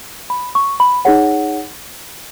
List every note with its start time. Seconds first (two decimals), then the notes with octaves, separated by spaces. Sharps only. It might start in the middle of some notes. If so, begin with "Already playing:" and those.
0.30 B5
0.55 C#6
0.80 B5
1.05 D#4 G#4 C#5 F#5